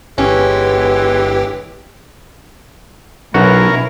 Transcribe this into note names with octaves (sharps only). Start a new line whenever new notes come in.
G1 E3 G#3 B3 C#4 G4
B1 B2 C#4 E4 F#4 A#4